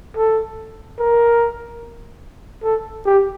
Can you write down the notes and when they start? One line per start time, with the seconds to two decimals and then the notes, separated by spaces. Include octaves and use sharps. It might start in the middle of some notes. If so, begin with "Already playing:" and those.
0.17 A4
0.99 A#4
2.63 A4
3.05 G4